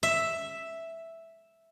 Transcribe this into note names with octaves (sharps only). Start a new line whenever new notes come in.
E5